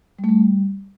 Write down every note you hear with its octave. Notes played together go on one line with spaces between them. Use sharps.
G3
A3
G3